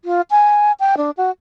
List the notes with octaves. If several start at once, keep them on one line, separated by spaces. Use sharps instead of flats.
F4
G#5
G5
D4
F#4